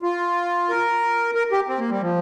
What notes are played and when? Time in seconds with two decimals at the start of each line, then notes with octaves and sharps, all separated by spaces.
0.02 F4
0.69 A#4
1.35 A#4
1.52 G4
1.68 C4
1.79 A#3
1.90 G3
2.02 F3